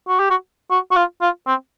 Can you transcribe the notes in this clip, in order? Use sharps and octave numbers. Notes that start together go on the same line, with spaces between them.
F#4
G4
F#4
F#4
F#4
F4
F4
C4